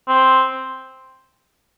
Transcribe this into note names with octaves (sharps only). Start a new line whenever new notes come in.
C4